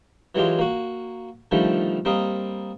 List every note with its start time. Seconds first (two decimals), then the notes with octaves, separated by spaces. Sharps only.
0.35 E3 F#3 G#3 F4 G4
0.59 A#3 F#4
1.51 D3 D#3 F3 G3 A3
2.05 G3 A#3 C4 A#4 D#5